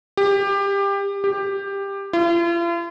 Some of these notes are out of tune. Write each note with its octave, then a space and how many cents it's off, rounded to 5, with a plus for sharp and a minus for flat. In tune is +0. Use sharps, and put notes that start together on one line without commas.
G4 +20
G4 +15
F4 -45